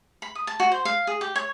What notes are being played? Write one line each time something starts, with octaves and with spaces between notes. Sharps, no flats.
B5
D#6
A5
F#4
C5
F5
G#4
G4
C#5